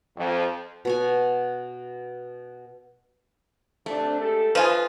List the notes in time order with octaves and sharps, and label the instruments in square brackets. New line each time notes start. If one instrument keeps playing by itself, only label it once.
[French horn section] F2
[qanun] B2 C#5 G#5
[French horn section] C3 C4 D4 [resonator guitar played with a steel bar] A3
[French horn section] G#3 G4 A4
[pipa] F3 F4 [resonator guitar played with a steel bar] B4 G#5 [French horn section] D#5